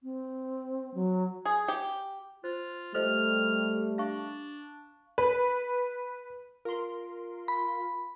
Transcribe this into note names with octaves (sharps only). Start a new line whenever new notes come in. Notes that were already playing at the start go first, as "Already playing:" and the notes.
C4
F#3
G#4
G4
F4 C5
G3 A3 A4 C5 D#5 F6
D4 F5 C#6
B4
F4 A#4 C6
B5